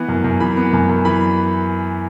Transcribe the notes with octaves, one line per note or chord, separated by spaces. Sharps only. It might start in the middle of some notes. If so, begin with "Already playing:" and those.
Already playing: E3 B3
F#2
F#2
E3 B5
B3
F#2
F#2
E3 B5